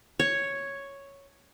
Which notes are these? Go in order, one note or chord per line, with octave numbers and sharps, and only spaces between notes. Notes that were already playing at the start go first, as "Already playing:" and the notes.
C#5